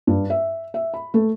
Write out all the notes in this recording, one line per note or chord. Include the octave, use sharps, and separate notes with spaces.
G2
E5
E5
B5
A3